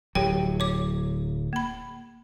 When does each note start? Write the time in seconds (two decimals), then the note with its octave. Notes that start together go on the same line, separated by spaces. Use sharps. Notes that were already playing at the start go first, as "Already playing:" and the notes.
0.15 D1 F#3 G4 C#5 G5
0.60 C#5 D6
1.53 A#3 B5